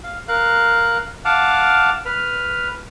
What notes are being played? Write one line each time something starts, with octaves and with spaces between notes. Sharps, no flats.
F5
A#4 F5 F#6
F5 F#5 A5 D6 F6
B4 F6